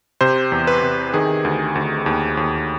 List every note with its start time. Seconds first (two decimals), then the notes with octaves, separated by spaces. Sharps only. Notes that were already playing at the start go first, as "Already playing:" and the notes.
0.21 C3 C5
0.52 E2
0.67 B4
0.82 C3
1.14 D#3 G#4
1.45 D2
1.75 D2
2.06 D#2
2.37 D#2